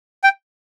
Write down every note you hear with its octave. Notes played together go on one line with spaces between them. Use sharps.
G5